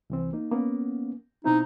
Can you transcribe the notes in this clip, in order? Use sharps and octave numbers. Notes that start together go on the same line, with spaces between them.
C2 E3 C4
A#3 D#4
A#3 B3 C#4
B2 C4 D#4 E4